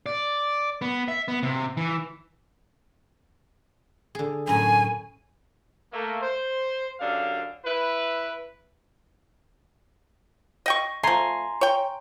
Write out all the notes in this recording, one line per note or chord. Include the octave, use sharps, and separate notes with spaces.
D5
B3
E5
B3
C3
E3
D3 G#4
F#2 A2 G#5
A3 A#3
C5
F#2 D3 D4 G4 F5
E4 B4
D#5 G5 C#6
F3 A3 G#5 A#5 C6
C#5 G5